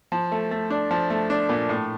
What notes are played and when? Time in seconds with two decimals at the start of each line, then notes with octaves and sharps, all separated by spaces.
0.12 F3
0.32 A3
0.51 A3
0.70 D4
0.91 F3
1.10 A3
1.30 D4
1.49 A#2
1.69 A2